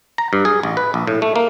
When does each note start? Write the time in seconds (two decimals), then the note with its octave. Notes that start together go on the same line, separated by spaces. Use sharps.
0.18 A#5
0.33 G2
0.45 G#4
0.63 A1
0.77 B4
0.94 A#1
1.07 A2
1.22 A3
1.36 A#3